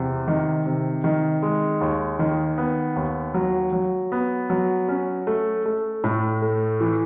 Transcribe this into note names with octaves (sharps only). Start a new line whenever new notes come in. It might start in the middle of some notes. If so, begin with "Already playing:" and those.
Already playing: E2 C3
D#3
C3
D#3
G#3
D#2
D#3
B3
D#2
F#3
F#3
B3
F#3
C#4
A3
A3
A2
A3
E3